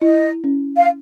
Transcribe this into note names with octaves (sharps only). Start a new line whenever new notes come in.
E4 D#5
C#4
F5